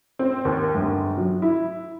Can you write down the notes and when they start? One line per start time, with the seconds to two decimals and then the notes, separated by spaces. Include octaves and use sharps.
0.19 C4
0.45 D#2
0.75 G1
1.17 F#3
1.42 E4